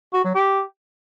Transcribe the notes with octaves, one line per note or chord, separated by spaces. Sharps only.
F#4
F#3
G4